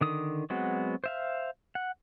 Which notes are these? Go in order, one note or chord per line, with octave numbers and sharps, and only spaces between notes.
D3 D#3 D#6
F#3 G#3 B3 C4 F#4
C5 E5 F5
F#5